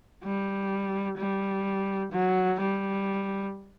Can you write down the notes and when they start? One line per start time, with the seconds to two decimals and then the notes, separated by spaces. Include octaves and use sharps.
0.24 G3
1.17 G3
2.12 F#3
2.59 G3